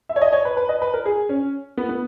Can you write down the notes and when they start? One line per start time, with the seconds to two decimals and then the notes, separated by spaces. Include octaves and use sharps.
0.09 E5
0.16 C#5
0.21 D#5
0.33 C#5
0.45 B4
0.57 B4
0.69 D#5
0.82 B4
0.94 A#4
1.06 G#4
1.29 C#4
1.77 B3
1.89 B3